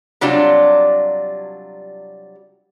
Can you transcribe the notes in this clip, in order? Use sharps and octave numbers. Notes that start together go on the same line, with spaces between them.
C3 F#3 G3 D4 F4